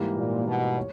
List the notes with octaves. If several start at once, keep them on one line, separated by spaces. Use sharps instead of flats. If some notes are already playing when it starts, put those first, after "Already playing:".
Already playing: G#2 E3 G3 A#3
A#2
B2
C#5